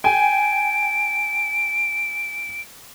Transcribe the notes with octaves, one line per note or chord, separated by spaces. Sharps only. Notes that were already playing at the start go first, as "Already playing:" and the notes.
G5 G#5 D7